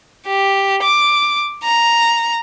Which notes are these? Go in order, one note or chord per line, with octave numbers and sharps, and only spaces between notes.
G4
D6
A#5